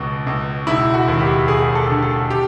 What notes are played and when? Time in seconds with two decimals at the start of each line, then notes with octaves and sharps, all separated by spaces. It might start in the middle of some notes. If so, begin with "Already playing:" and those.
Already playing: C#2 B2
0.27 C#2
0.67 E1 E4
0.94 F#4
1.08 D#2
1.21 G4
1.48 E1 G#4
1.75 A4
1.90 D3
2.02 A4
2.30 G4